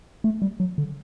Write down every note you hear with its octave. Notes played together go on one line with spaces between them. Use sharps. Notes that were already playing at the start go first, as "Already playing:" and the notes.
A3
G3
F#3
D3